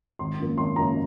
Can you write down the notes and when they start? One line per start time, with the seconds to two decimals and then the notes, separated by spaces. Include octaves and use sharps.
0.19 G#1 C6
0.38 F#2 F3 A#3
0.58 G#1 C6
0.76 F#2 F3 A#3 A#5